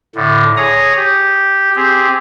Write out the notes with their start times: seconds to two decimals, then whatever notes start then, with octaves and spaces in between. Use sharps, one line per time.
0.15 A2 D3
0.57 G#4 C#5 A#5 D#6
0.96 G4
1.76 C4 G4 G#4